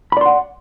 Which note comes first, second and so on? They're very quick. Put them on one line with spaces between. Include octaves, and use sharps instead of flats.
B5 D5 C6 F#5